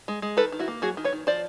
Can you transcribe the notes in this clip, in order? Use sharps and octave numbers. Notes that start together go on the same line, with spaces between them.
G#3
G#3
D#3 A4 B4
D#3
E4 F#4
A#3
F#3 F#4 G#4
D#3
B4 C#5
D#3
F3 C5 D5